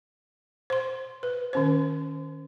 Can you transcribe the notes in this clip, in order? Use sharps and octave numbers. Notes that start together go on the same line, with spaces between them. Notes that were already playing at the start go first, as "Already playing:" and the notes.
C5 C6
B4
D#3 C#4 C5